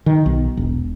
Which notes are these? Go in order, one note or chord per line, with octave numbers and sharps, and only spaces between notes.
D#3
B1
E1